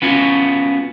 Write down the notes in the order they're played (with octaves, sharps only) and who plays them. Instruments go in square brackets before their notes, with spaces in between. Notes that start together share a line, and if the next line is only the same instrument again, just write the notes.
[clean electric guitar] B3 C#4 F4 F#4